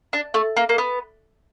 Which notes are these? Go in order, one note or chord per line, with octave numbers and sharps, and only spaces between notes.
D4
A3
A#3
A#3
B3